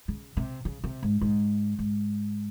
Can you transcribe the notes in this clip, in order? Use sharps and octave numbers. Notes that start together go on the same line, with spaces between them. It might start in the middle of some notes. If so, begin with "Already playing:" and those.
C#3
C3
C#3
C3
G#2
G#2
G#2